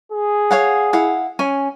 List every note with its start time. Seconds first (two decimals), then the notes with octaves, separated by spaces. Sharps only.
0.12 G#4
0.51 C#5 F5 F#5
0.93 E4 F5 F#5
1.39 C#4 G#5